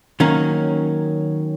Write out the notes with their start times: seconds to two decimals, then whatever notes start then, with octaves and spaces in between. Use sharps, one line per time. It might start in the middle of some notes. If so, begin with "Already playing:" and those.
0.20 D#3 F#3 A#3 C#4